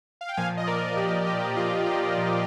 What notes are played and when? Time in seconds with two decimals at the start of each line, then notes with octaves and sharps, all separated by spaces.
0.21 F5
0.29 G5
0.37 A#2 F3 F5 G#5
0.57 D#5
0.67 A#4 D5
0.96 A#2 F3 G4 A#4
1.27 G4
1.56 A#2 F3 F4
1.86 G4
2.17 A#2 F3